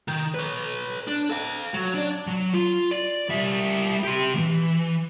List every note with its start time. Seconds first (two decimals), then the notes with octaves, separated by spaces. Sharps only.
0.08 D#3
0.34 B4 C#5
1.07 D4
1.30 A4 F5
1.74 F#3
1.94 D4 D5
2.27 F#3
2.53 F4
2.91 D5
3.29 G3 E5
4.04 G4 C6
4.34 D2 E3